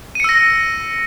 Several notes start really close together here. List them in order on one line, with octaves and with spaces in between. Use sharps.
D#7 C#7 E6 A#6